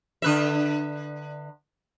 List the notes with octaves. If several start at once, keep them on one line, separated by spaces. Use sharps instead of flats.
D3 B4 E5